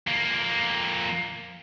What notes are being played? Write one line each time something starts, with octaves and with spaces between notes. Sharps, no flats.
F2 A#3